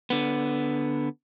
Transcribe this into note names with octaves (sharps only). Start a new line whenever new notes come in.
D3 B3